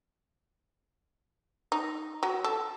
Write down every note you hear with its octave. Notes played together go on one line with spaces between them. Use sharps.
D#4
F#3
A4